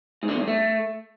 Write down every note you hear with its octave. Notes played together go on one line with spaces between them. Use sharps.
G#2
D3
E2
G2
A3